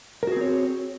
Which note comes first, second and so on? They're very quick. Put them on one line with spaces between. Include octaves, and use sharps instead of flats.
A#4 F#4 G#4 C4 C#5